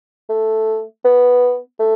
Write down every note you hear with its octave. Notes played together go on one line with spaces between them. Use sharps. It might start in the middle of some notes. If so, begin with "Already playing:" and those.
A3
B3
A3